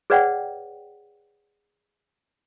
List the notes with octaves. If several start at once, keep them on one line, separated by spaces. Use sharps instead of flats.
G#4 B4 C#5 D5 F#5 G5